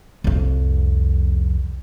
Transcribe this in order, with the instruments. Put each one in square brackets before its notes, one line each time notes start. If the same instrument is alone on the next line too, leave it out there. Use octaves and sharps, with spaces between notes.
[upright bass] C2 F2